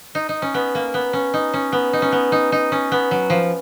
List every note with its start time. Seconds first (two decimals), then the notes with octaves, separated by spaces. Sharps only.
0.15 D#4
0.29 D#4
0.42 C#4
0.54 B3
0.75 A#3
0.94 B3
1.13 C#4
1.34 D#4
1.54 C#4
1.72 B3
1.93 D#4
2.02 C#4
2.12 B3
2.32 D#4
2.52 D#4
2.72 C#4
2.92 B3
3.11 F#3
3.30 F3